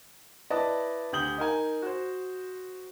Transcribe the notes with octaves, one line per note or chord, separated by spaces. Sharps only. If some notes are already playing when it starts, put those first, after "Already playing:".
E4 B4 D5 D#5 A5
D2 G4 D#6 G6 F#7 G7
D#4 A#4 G#5
F#4 C5